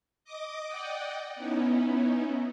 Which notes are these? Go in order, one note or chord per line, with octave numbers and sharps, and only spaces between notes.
D#5 D6 D#6
D5 D#5 F#5 G5
B3 C#4 D#4 E4